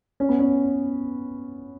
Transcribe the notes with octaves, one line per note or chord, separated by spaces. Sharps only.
C#4
B3
C#4